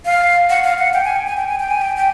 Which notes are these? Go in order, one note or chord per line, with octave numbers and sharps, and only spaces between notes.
F5
F#5
F5
F#5
G5
G#5
G5
G#5
G5
G#5
G5
G#5
G5
G5